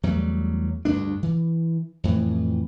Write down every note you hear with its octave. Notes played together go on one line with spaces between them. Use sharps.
E2 F#3 G3 A3
D2 G2 A#3 D4
E3
F2 A2 E3